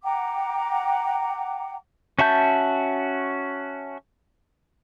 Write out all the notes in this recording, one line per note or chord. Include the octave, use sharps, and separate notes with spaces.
F#5 G5 A#5 D6
C#4 F#4 E5 A5 G6